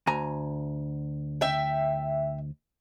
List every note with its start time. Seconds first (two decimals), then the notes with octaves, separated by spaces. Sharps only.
0.07 D2 G#5 A#5
1.41 E5 G5